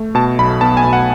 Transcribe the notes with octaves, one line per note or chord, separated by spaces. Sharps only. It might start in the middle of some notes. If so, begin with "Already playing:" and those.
Already playing: A3
B2 A5
B1 B5
B3 A5
G#5
B2
F#5